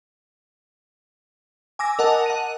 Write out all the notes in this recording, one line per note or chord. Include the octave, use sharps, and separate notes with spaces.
G#5 D6 E6 A#6
A#4 D#5 F#5 A5
F#5 D#7